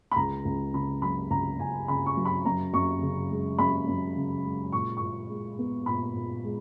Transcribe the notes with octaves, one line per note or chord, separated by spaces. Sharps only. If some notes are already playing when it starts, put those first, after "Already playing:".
B5
C#2 A#5
C#2
C#3 B5
F#3 B5
C#2 A#5
C#2 G#5
C#3 B5
C#6
F#3
B5
F#2 A#5
F#2 C#6
C#3
G#3
F#2 B5
F#2
C#3
G#3
A#2 C#6
A#2 C#6
G#3
B3
A#2 B5
A#2
G#3